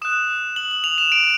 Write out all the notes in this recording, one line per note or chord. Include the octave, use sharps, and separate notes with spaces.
D#6 F#6 E7
F#7
F#7
F7
E7
D7